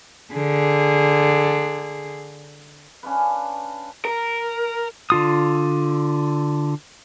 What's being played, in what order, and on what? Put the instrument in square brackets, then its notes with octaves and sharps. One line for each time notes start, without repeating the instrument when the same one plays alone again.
[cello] D3 G#4
[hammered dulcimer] C#4 D4 F4 B4
[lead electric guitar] A#4
[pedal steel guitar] D3 F4 D#6